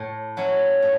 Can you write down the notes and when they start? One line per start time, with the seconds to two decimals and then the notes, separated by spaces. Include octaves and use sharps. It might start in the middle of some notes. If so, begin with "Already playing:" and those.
Already playing: A2
0.37 F#3 C#4 E4
0.82 A2